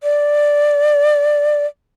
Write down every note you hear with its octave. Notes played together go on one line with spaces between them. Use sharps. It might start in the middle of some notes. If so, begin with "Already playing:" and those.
D5